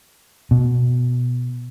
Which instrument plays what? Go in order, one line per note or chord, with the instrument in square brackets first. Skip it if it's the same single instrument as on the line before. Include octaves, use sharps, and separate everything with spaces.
[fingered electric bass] B2